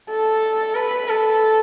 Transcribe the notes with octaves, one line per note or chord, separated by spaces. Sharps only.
A4
B4
A4